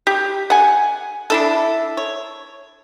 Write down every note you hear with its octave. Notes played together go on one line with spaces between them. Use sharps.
G4
F#5 G#5
D4 E4 A4
C#5